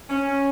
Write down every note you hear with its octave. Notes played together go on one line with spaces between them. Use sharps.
C#4